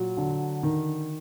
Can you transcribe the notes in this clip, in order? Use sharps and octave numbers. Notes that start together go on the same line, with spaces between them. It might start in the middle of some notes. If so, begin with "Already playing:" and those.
Already playing: A#2 F#3
D3
D#3